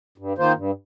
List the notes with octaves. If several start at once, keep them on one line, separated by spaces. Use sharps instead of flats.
G2
D#3 A#3 F4 C5
G2